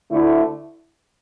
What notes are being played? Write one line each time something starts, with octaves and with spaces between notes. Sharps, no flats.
D2 D3 A3 E4